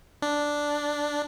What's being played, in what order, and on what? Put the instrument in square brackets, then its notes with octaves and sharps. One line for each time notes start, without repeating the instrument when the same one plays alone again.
[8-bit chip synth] D4